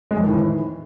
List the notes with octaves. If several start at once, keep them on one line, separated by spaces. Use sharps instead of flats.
G#3
F2
D#3
A2
E3